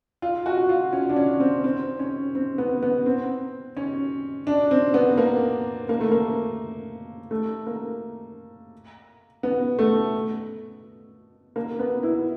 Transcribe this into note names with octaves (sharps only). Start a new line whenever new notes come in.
F4
F#4
F4
C#4
D4
C#4
C4
C4
C#4
C4
B3
B3
C4
C#4
D4
C4
B3
A#3
A#3
A3
A#3
A3
A#3
B3
A3
A#3
B3
E4